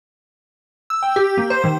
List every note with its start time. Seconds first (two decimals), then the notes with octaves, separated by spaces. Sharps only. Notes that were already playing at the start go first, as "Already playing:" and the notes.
0.90 E6
1.03 G5
1.16 G4
1.37 A#3
1.50 C5
1.64 D#3